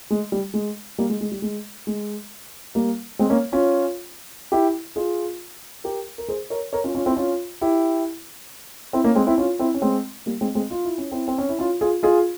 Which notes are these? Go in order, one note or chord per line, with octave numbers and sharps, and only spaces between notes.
G#3
G3
G#3
G3 A#3
G#3
G#3
G3
G#3
G#3
G3 A#3
G#3 C4
A#3 C#4
C#4 F4
E4 G4
F4 G#4
G4 A#4
A#4
G#4 C5
A#4 C#5
A#4 C#5
C#4 F4
C#4 F4
C4 E4
C#4 F4
E4 G4
C4 E4
A#3 C#4
G#3 C4
C4 E4
C#4 F4
C4 E4
C#4
G#3 C4
G3 A#3
G#3 C4
G#3 C4
F4
E4
C#4
C4 E4
C4
C#4
E4
C#4 F4
F4 G#4
F4 G#4